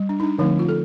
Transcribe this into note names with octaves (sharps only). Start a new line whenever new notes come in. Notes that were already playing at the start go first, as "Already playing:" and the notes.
Already playing: G3
D4
D#4
D4
D3 F3 A3 C4 D#4
F4
A4